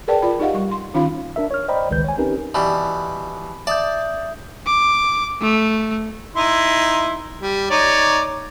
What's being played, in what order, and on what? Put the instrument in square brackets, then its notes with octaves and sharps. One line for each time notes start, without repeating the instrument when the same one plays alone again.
[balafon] G#4 A#4 B4 D5 G5 A5
F4 D5 B5
D#4 G4 D#5 F5 F#5
G3 C#6
C6
D#3 C#4 D#4 F4 F5 B5
[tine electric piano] D4 A#4 E5
C#5 F6
C5 D5 D#5 G5 A#5 B5
G#1 C#2 D#3 G#3 B4 G6
C#5 G#5
C4 C#4 D#4 G4 A#4 B4
[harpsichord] B2 E3 G3 [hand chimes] B5
[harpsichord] D5 A5 [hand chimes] E5 D#6 G6
[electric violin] D6
A3
[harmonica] D#4 E4 C6
G3
D#4 C#5 D5